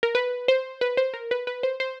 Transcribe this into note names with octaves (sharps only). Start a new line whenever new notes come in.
A#4
B4
C5
B4
C5
A#4
B4
B4
C5
C5